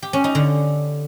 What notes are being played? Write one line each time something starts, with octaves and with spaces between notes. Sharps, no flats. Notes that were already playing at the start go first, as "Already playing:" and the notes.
G4
C#4
D#4
D3